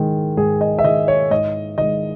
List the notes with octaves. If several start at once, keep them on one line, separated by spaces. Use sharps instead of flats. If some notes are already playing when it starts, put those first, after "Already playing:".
Already playing: G#2 D#3 G#3
G#2 G#4
D#5
E5
D#3 G#3 D#5
C#5
G#2 D#5
D#3 G#3 D#5